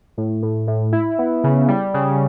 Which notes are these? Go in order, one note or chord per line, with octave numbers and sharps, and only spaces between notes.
A2
A2
A2
E4
B3
C#3
G3
C#3